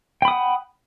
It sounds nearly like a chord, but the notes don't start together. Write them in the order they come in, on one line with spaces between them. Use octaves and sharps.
G5 B5 D#6 F#5